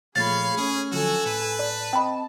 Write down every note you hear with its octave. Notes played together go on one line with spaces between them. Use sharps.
A#2 F3 A3 G#4 C#5 F5 B5 A6
A3 C#4 G#4
D3 F3 F#3 F#4 A4 G#5 E6
A2 B4
D5 A5
C4 D#5 G5 B5